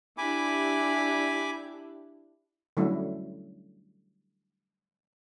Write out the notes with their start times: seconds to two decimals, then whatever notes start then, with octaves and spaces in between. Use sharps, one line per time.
0.18 D4 E4 G4 G#5 B5 D6
2.77 D3 F#3 G3 A3 C#4 E4